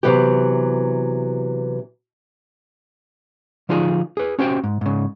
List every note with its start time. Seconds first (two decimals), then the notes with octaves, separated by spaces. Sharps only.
0.03 C3 E3 F#3 B3 G4
3.69 D3 F3 D#4 F4 G#4
4.17 G#4 B4
4.39 C#4 F#4 G4 C5 G5
4.64 G#2
4.81 G#2 C#3